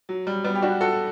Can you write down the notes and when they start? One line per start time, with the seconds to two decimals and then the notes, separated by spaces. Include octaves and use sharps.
0.09 F#3
0.27 G3
0.44 G3 B3
0.55 G4
0.62 D4 F#4
0.81 F#4 A4